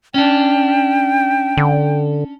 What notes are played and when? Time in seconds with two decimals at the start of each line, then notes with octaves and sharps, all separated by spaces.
0.14 C#4 D4 G5
1.57 D3